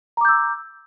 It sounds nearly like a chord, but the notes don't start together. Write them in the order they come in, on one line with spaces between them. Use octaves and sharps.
A#5 D6 G6 E6